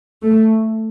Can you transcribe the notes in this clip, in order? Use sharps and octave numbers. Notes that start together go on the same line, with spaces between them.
A3